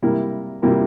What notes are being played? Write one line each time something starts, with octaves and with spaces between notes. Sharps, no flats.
C3 G3 A#3 E4 A#4
C3 G3 A#3 E4 A#4